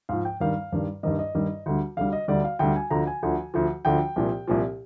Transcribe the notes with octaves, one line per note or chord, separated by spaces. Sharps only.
G#2 F3 F5
G5
G2 D#3 G3 F5
G2 D#3 G3
G2 D#3 G3 D#5
D#5
G2 D#3 G3
D2 D3 G3
D2 D3 G3 F5
D#5
D2 D3 G3 D5
F5
D2 D3 G3 G5
G#5
D2 D3 F3 A#5
G#5
D2 D3 F3
D2 D3 F3
D2 D3 F3 G5
C2 A#2 F3
C2 A#2 F3